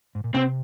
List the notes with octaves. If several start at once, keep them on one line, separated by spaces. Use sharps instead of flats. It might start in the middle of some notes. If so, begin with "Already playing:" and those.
G#2
A#2
C3 C4